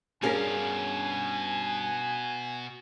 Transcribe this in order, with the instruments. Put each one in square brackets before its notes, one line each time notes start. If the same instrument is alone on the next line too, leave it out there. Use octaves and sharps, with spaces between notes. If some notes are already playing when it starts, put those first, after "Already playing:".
[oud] G2 C#4 D4 [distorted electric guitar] B2 F5 [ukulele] G#4 A#4 [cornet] G#5